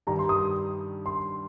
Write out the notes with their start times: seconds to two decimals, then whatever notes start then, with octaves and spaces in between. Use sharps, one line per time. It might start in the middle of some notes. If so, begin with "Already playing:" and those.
0.07 G2 D#3 G3 A#5
0.19 C6
0.29 D#6
1.06 C6